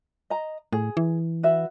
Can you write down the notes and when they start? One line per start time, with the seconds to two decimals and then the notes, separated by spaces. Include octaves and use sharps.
0.30 D#5 A#5
0.73 A2 G#4
0.97 E3
1.43 F#4 B4 E5